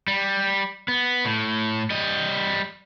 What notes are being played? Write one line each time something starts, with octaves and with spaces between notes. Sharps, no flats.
G3
B3
A2
G3 D#5